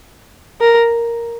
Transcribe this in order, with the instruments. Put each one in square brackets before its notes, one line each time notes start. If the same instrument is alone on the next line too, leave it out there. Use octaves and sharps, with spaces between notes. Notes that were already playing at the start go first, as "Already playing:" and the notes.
[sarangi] A#4